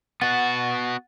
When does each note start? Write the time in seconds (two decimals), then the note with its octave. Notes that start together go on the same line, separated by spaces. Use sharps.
0.22 B3 F#4 F#5 A6